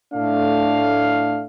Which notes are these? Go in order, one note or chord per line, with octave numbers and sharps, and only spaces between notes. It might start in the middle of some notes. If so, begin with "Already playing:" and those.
A2 A3 D4 F5